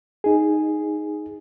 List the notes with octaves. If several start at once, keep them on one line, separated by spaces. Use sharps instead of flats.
D#4 G#4